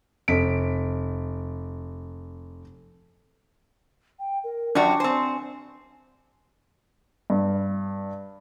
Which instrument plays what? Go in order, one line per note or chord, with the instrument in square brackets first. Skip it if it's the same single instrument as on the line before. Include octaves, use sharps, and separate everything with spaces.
[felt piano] F1 B6 D7
[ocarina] G5
A#4
[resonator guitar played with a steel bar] F#2 F3 F#4 [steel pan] D4 [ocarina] G5
[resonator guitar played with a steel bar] C4 C5 [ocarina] G#5
[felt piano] G2